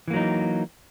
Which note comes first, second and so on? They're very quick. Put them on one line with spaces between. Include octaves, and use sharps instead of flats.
E3 A#3 F#3 D#4